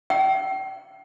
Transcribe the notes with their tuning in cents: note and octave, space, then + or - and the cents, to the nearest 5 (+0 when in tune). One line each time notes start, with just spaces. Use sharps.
G5 -35